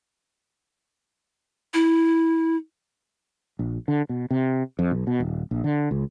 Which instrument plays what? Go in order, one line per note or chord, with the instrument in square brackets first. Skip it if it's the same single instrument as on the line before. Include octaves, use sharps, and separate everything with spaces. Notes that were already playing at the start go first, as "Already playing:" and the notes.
[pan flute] E4
[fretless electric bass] A#1
D3
B2
C3
F2
B1
B2
D#1
A#1
D3
C#2